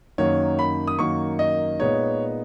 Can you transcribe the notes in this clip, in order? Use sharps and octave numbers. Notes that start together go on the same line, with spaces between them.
F#2 D#3 F#3 A#3 C#5
B5
D#6
F#2 D#3 F#3 A#3 C#6
D#5
A#2 G#3 B3 D#4 C#5